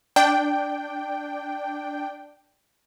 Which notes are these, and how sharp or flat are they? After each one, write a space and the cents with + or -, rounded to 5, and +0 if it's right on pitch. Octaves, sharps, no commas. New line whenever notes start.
D4 +0 G5 +0